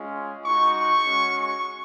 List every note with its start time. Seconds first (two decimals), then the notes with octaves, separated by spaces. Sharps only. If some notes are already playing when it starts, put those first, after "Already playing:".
Already playing: G#3 C#4 F4
0.44 G#3 D#4 F#4 C#6
0.76 C#6
1.05 G#3 C#4 F#4
1.36 C#6